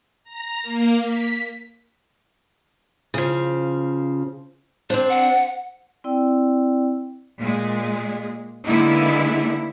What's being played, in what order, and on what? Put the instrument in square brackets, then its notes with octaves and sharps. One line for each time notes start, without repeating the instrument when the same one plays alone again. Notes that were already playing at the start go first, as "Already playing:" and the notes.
[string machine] A#5
A#3
B6
[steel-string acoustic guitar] C#3 F3
[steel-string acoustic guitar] C4 D4 [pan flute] C5
[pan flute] F#5
[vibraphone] C4 E4 D5 G5 E6
[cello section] A#2 G#3
D3 G#3 A#3 B3 D#4 E4